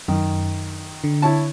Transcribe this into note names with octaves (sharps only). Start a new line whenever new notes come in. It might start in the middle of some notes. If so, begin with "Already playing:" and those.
F#2 D#3
D3
E4 C#5 A5